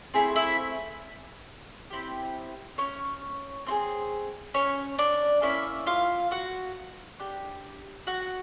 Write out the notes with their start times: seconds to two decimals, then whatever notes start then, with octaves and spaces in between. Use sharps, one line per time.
0.14 A3 C4 E4 G#4
0.36 E4 E5
1.90 C4 E4 G4
2.78 C#4 C#5
3.67 C4 F4
3.71 G#4
4.54 C#4 C#5
4.98 D4 D5
5.42 A#3 C#4 E4 E5
5.87 F4 F5
6.31 F#4 F#5
7.19 D4 G4
8.07 F#4 F#5